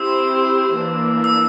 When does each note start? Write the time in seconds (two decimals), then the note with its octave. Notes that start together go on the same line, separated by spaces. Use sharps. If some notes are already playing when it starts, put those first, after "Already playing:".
Already playing: C4 E4 G4 C5 E6
0.76 E3 A#3 D4
1.24 E6